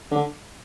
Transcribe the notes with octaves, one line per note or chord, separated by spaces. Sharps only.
D3